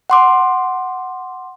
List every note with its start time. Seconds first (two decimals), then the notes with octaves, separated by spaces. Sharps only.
0.10 F#5 C6 D6